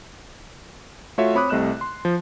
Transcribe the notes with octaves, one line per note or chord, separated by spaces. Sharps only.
A3 F4 F#4 C#5 E5
C4 C#5 B5 D6 D#6 F#6
C2 C3 A3 D#5 F#6 E7
C6
F3